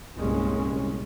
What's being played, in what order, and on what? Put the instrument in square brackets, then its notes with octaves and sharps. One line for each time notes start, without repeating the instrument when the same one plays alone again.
[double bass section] C2 G2 A#2 G#3 C#4